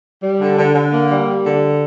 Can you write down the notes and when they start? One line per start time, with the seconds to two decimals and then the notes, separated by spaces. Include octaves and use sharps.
0.23 G3
0.41 D3
0.58 D3
0.75 D3
0.93 A#3
1.09 G3
1.28 G3
1.46 D3